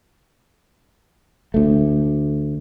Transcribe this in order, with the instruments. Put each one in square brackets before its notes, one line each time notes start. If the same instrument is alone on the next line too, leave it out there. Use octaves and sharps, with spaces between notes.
[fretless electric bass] D2 A3